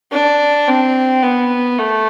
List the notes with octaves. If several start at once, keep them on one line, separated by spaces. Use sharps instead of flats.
D4
C4
B3
A3